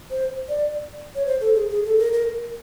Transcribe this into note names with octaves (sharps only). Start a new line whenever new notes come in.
C5
D5
C#5
C5
A4
G#4
G#4
A4
A#4
A#4